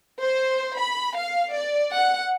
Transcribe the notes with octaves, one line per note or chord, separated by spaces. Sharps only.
C5
B5
F5
D5
F#5